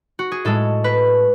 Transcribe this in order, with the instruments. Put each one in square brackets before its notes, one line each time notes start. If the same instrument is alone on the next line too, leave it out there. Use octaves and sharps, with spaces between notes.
[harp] F#4
G#4
A2 G#3 A4
B4